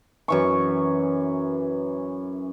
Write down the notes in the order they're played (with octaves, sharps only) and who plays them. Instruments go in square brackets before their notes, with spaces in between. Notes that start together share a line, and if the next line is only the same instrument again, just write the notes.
[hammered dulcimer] F#2 E3 C#6